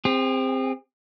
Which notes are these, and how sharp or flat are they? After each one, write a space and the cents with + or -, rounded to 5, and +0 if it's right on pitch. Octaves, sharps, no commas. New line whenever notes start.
C4 +0 G#4 -40